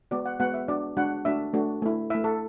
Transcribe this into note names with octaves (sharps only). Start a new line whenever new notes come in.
G#3 B3 F#4 D5
F#5
G#3 B3 F#4 F#5
E5
G#3 D4 F#4 D5
G#3 D4 F#4 F#5
A3 D4 F#4 E5
A3 D4 F#4
A3 E4
A3 E4 E5
A4